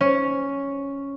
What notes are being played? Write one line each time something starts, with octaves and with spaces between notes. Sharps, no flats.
C#4